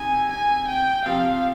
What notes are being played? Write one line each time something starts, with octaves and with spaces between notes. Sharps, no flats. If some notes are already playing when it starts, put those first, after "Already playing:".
Already playing: C3 D#4 G#5
G#5
G5
C3 F3 C4 F5